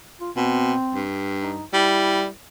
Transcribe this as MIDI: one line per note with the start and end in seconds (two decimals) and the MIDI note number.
0.21 0.30 65
0.36 0.73 47
0.36 1.03 60
0.94 1.61 43
1.42 1.64 63
1.73 2.27 55
1.73 2.28 64